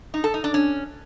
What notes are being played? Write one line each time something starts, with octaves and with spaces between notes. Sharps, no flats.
D#4
A4
D#4
D4
C#4